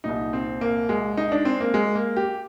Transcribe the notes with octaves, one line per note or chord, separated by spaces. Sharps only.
C2 A#2 D#4
C4
A#3
G#3
D#4
D4
C4
A#3
G#3
A#3
G4